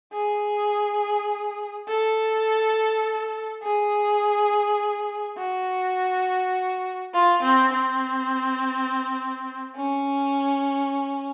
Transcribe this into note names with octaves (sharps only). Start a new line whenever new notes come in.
G#4
A4
G#4
F#4
F4
C4
C4
C#4